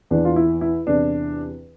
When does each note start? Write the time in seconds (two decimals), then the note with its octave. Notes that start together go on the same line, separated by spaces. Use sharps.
0.11 E2 E3 D4
0.25 F4
0.36 E4
0.61 E4
0.87 E2 C3 E3 D4